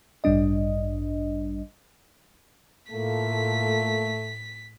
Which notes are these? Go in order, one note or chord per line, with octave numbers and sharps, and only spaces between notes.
A1 G2 G3 D4 D#5
A2 A3 A#3 F4 A4 B6